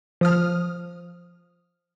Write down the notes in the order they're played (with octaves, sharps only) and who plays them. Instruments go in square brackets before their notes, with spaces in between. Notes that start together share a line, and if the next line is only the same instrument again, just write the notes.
[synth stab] F3 D#6 F6